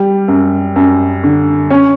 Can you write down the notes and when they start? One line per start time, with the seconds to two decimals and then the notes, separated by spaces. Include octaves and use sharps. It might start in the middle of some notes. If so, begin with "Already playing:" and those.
Already playing: G3
0.28 F#2
0.76 F#2
1.23 D3
1.70 C#4